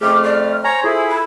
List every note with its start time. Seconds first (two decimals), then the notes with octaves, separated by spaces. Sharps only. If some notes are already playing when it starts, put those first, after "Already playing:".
0.01 F2 A3 C#4 G#4 D6 F6
0.24 D5 C#6
0.64 C5 C#5 G#5 A#5
0.84 E4 F4 G#4 A4
1.09 B5